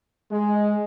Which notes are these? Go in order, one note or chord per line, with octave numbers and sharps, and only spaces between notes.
G#3